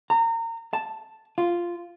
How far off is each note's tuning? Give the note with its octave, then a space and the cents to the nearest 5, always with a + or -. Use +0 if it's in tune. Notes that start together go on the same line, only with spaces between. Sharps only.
A#5 -30
A5 +0
F4 -5